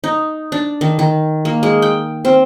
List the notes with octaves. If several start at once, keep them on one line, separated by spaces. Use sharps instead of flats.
D#4
D4
D#3
D#3
A#3
G#3
G5
C4